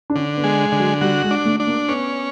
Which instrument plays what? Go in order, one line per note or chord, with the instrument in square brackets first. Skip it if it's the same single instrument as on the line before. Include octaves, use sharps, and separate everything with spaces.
[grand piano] D4
[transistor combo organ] D3 [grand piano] C#4
[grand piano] B3
[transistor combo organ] G#3
D3
[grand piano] F#3
[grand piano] G3 [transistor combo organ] F#4
[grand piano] G#3
[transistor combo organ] D4
[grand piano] A3
[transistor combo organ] D4
[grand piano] A#3
[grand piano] B3 [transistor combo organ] C#4